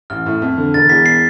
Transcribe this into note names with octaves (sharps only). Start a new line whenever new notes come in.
A1 F6
A2
F2
D3
E1 A6
E2 B6
C7